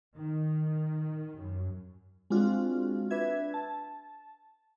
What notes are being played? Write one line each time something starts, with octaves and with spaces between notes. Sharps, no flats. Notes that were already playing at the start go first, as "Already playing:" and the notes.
D#3
F#2
G#3 C4 D4 F4 F#4
D4 B4 E5 G#6
A5